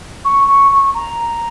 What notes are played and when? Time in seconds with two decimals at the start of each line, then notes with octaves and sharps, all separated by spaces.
0.25 C#6
0.48 C#6
0.72 C#6
0.94 A#5